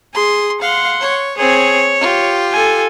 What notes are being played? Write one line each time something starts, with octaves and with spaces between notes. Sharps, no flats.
G#4 C6
F5 F#5 C6
C#5
C4 G#4 C#5
F4 G4
A4 G#5